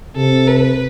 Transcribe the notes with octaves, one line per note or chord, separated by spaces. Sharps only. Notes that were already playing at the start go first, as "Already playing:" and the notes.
C3 A4
B4